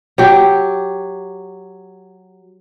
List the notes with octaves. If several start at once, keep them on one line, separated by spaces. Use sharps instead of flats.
F#3 G4